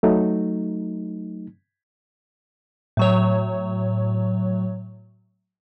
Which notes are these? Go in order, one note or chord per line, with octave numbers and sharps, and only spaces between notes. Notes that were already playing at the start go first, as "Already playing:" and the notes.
F#3 A3 D#4
A2 F#3 C#5